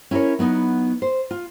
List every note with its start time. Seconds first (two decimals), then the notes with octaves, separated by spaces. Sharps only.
0.11 C#4 E4 A4 A#4 C#5
0.39 F#3 B3 D#4
1.02 C5
1.31 F4